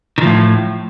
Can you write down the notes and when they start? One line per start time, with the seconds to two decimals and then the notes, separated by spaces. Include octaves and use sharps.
0.18 D#3
0.21 F3
0.25 A2